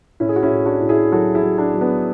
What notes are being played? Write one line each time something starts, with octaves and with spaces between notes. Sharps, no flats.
A2 C#4 E4
G#4
F#4
C#4 E4
A2
D4 F#4
A2
E4 G#4
F#3 F#4 A4
E4 G#4
F#3
D4 F#4
F#3
B3 D4